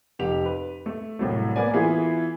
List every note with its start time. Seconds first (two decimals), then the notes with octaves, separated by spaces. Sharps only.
0.19 F1 G4 F7
0.46 B4
0.86 A3
1.19 C2 A2 F#3 A3
1.56 A#3 B3 A#4 D5 G#5
1.74 E3 B3 E4 F4 G#4 A4